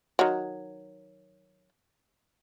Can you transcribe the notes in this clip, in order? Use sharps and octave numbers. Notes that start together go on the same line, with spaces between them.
D#3 F#3